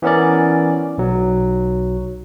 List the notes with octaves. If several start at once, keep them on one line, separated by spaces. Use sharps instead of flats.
E3 B3 C#4 A#4 D5
B1 F#3